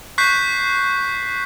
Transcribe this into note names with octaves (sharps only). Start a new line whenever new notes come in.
C#6 F#6 G6 B6 C7